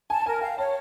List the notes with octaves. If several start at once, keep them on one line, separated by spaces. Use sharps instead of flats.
G#5 A5
A#4 G#5
F5 G5
C#5 A5